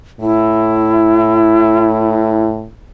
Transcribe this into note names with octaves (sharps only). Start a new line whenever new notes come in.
A2 E4